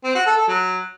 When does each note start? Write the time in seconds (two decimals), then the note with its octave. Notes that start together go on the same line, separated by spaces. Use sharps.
0.04 C4
0.15 F#4
0.26 A4
0.37 A4
0.48 F#3